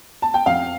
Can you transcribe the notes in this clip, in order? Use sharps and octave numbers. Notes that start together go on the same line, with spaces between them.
A5
G5
F2 F5